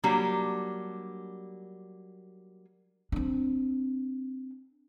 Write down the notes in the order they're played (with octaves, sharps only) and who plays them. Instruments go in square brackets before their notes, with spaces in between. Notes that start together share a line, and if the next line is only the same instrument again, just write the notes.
[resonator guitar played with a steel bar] F#3 G3 A#3 D4
[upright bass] C4 D4